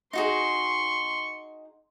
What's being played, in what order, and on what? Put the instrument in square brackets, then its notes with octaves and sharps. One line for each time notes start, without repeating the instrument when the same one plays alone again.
[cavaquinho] D#4 F#4 G#4 [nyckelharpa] C6 [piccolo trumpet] C#6